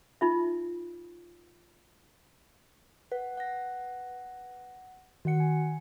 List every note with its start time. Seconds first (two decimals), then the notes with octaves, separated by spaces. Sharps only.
0.21 D#4 F4 E5
3.12 B4 F#5
3.37 F#5 A#6
5.25 D#3 F#4 F#5 C#7
5.40 G#5